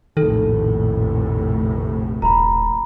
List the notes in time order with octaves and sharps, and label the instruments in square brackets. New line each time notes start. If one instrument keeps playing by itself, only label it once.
[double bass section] F1 A#1 A2 [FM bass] D#3 [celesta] A4
[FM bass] D#1 [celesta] A#5 B5